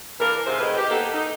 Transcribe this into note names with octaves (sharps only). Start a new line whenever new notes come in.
E3 A#3 D4 A#4
G#2 C3 C5
A2 D#3 F4 G#4 B4
G4
A#3 B3 D#4 G4 A4
D#4